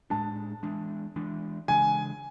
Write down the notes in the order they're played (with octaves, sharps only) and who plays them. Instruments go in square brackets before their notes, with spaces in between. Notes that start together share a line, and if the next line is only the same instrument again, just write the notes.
[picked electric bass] A2 G#3 D4 [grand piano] A5
[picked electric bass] E3 G#3 D4
E3 G#3 D4
[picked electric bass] C#3 E3 G#3 D4 [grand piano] G#5